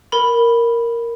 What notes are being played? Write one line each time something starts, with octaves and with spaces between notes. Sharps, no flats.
A#4 B5